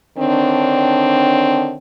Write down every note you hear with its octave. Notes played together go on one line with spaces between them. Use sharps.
D3 D#3 C4 D4 C#5